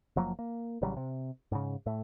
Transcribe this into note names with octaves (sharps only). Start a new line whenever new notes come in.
F#1 F3 F#3 A#3
A#3
A1 C#3 F#3 G3
C3
G#2 C#3
A2 A3